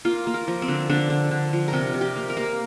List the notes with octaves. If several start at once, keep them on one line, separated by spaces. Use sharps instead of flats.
A#3 F4
A#3
A#4
F3
C4
D3
D3 D4
D3
D3
F3
A#4
C3 G4
C3
G4
A#3
A#4
A#3